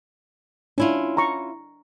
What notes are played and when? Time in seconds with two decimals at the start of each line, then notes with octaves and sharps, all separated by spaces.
0.78 C#4 D4 E4 F4
1.17 A#5 C#6